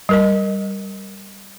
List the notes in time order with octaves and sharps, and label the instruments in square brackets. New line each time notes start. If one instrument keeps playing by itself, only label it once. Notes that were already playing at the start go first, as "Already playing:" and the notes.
[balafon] G3 A#4 D#5